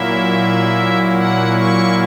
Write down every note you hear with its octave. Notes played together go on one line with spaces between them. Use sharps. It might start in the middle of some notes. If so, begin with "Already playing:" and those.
Already playing: A#2 F#3 A#3 E4 E5
F#5
C#6